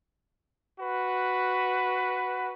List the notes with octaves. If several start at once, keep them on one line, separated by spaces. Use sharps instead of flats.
F#4 B4